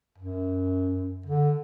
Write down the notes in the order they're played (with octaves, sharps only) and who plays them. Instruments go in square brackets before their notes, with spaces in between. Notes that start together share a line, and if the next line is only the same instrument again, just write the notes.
[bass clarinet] F#2
D3